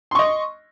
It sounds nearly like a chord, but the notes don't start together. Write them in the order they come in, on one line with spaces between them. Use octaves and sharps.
C6 C#6 D#5